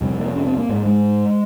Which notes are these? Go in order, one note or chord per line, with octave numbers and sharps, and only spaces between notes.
F2 C3 G3
A#3
C#4
C4
A#3
G#2 G#3
G#3